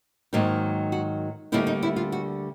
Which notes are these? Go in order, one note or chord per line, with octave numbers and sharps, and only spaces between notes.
G#2 D#3 F#3 A#3 D#4
F#4
D2 D3 G3 A#3 D#4 E4
D#4
E4
F4
F#4